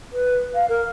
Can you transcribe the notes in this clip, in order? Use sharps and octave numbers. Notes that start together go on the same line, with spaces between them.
B4
F5
A#4